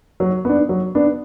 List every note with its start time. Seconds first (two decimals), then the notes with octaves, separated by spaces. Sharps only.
0.20 F#3
0.45 B3 D4
0.69 F#3
0.95 B3 D4